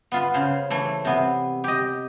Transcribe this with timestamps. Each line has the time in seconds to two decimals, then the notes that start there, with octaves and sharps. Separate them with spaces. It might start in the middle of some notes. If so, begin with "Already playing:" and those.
0.12 B3 F4 B4
0.34 C#3 C5
0.70 E3 A3
1.05 C3 B3 C6
1.64 G4 D#5